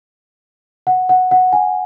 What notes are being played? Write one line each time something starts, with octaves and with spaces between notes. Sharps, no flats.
F#5
F#5
F#5
G#5